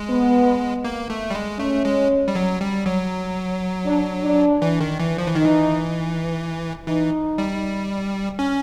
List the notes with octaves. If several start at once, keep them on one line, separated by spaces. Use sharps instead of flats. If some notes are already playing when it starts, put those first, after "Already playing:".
Already playing: G#3
B3
A#3
A3
G3
G#3
A3 C#4
G#3
G3
F#3
G3
F#3
D4
D4
E3
D#3
E3
F3
E3
D#3 D#4
E3
E3 D#4
G3
C#4